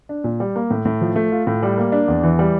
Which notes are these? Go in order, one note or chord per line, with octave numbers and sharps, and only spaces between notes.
D4
A#2
G3
A#3
A2
A2
F3
A3
F4
A2
G3
A#3
D4
E2
E3
G3